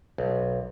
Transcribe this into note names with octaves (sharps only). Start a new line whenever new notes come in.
B1